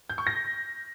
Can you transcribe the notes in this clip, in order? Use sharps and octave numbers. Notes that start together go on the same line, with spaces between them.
G6
C#6
A#6